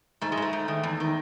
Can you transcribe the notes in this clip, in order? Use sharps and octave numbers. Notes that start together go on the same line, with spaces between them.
G#2 A3
G#3
G#2 A3
G#2
D#3
E2
D#3